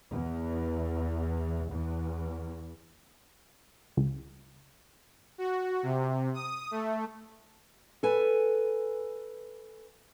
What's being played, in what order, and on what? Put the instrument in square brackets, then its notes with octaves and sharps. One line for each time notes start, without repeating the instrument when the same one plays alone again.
[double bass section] E2
E2
[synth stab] C#2
[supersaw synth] F#4
C3
D#6
A3
[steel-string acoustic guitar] A4 B4 G#5